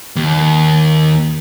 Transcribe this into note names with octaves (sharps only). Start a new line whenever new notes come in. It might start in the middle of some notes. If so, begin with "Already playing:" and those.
D#2